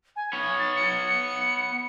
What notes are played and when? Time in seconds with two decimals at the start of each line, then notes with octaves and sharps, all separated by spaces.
0.16 G#5
0.33 B3 C#5 G#6
0.59 A6
0.75 C#7